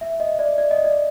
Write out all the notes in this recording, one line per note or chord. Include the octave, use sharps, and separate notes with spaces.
E5
D#5
D5
D5
D#5
D5